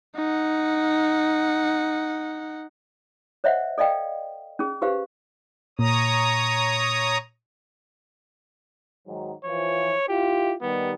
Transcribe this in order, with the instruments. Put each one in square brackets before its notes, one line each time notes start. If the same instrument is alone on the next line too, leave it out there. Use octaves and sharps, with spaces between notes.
[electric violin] D#4 F#5
[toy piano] C5 C#5 D#5 E5 F#5
A4 D5 D#5 F5 G5
C#4 G#4
F#4 G4 B4 C5 F5
[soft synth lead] A#2 [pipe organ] C#5 A#5 D#6
[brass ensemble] G#2 D#3 F#3
[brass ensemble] E3 F3 [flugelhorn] C#5
[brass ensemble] E4 F4 [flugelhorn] G4
[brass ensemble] D#3 G3 [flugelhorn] B3